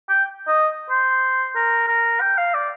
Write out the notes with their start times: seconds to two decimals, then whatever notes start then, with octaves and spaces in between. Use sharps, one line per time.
0.09 G5
0.48 D#5
0.90 C5
1.56 A#4
1.88 A#4
2.21 G5
2.38 F5
2.54 D5